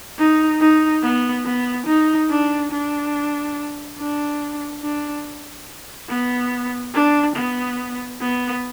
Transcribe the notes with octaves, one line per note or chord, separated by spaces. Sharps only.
D#4
D#4
B3
B3
D#4
D4
D4
D4
D4
B3
D4
B3
B3